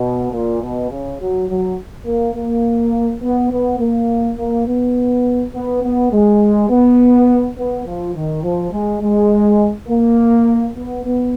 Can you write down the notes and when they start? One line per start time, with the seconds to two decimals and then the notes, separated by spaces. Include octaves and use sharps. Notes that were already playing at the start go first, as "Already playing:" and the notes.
Already playing: B2
0.32 A#2
0.62 B2
0.90 C#3
1.20 F#3
1.49 F#3
2.06 A#3
2.35 A#3
3.23 B3
3.51 B3
3.80 A#3
4.39 A#3
4.66 B3
5.54 B3
5.83 B3
6.12 G#3
6.69 B3
7.57 B3
7.86 F3
8.15 D#3
8.43 F3
8.72 G#3
9.02 G#3
9.88 A#3
10.76 B3
11.04 B3